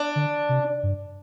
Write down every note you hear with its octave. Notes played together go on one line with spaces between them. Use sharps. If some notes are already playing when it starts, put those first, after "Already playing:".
Already playing: D4
D3
C3
G2